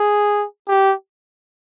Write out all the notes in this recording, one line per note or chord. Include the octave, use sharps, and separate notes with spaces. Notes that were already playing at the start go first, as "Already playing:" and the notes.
Already playing: G#4
G4